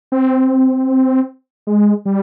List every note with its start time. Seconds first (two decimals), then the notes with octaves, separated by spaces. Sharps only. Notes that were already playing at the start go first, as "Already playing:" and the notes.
0.12 C4
1.67 G#3
2.05 G3